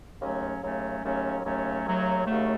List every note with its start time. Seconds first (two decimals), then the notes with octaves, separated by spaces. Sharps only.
0.20 D#2 C#3 F#3 A3 C#4
0.62 D#2 C#3 F#3 A3 C#4
1.03 D#2 C#3 F#3 A3 C#4
1.44 D#2 C#3 F#3 A3 C#4
1.85 D#2 C#3 F#3 A3
2.26 D#2 C#3 F#3 A3